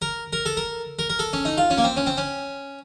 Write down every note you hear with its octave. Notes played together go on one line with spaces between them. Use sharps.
A#4
A#4
A4
A#4
A#4
A#4
A4
C#4
D#4
F4
C#4
A#3
C4
C#4
C4
C#4